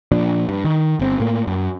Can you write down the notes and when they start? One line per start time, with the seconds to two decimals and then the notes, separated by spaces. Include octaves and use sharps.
0.12 A#2 F3 D4
0.49 G2
0.64 D#3
1.00 G1 C4
1.20 A2 A#3
1.47 F#2